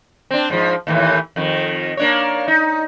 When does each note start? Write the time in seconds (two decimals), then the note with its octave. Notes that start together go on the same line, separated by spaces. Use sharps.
0.31 C4 D4
0.50 G#2 F3
0.87 D#2 A2 E3
1.36 F2 D#3
1.97 A#3 D4 C#5
2.48 D#4